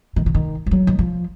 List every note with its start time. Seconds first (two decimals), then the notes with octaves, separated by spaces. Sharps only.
0.16 D#3
0.26 D3
0.35 D#3
0.66 F3
0.71 F#3
0.87 D#3
0.99 F3